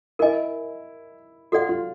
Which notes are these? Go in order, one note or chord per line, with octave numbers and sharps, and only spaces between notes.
E4 A#4 D#5 G#5
F4 F#4 A4 D5 F#5
F4